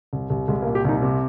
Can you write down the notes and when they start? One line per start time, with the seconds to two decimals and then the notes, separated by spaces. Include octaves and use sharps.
0.13 C2
0.30 C2
0.48 C2 G#3
0.62 A#3
0.67 A#2
0.75 G4
0.85 C2 D#4
1.02 C3